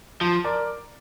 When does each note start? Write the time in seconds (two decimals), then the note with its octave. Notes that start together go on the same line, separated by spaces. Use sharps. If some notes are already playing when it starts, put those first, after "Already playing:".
0.21 F3 A5 C6
0.44 A#4 D5